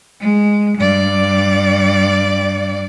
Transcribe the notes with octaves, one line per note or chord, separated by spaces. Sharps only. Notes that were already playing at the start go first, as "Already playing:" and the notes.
G#3
G2 D5